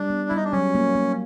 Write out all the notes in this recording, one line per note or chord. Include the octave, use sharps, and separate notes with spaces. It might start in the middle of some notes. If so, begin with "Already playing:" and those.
Already playing: G3 D4
B3
G3 E4
D#4
D4
F#3 C#4
A#3
A#3